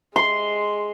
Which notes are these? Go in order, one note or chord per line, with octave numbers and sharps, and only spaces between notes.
G#3 C6